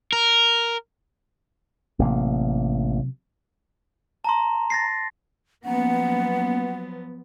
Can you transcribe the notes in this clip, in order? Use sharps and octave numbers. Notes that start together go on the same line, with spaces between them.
A#4
A1 C3 F#3 A#3 C4
A5 A#5 C6
A6 A#6 C7
F3 F#3 A#3 B3 C#4 F#5